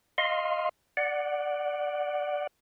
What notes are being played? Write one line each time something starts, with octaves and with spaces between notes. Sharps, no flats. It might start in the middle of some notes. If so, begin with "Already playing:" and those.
D#5 F5 C6
D5 F#5